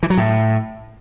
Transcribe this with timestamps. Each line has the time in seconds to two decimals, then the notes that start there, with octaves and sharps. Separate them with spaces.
0.03 E3
0.10 F#3
0.18 A2